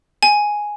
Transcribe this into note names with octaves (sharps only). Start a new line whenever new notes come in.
G#5